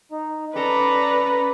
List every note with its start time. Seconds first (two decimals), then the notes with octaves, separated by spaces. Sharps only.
0.12 D#4
0.55 C#4 A4 B4 D5 A#5 D6